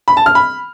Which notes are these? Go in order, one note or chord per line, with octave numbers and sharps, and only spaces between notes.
B5
A5
F6
B5